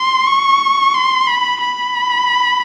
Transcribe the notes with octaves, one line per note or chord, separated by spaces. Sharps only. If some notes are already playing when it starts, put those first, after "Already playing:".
Already playing: C6
C#6
C6
B5
B5